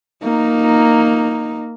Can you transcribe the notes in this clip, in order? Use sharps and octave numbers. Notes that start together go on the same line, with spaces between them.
A#3 D#4